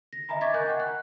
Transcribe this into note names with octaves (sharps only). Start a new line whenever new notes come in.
A#6
D#5 E5 G#5 A#5 B5
C#6 D6 G#6 A6 B6
A#4 D#5 G#5 C#6 F#6 G6
F#5 G5
F#6